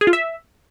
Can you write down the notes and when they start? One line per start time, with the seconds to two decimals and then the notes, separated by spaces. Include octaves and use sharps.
0.01 G#4
0.07 F4
0.13 E5